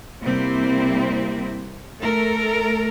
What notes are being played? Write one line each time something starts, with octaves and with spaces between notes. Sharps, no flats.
C3 G3 A#3 C4 E4
A3 A4 A#4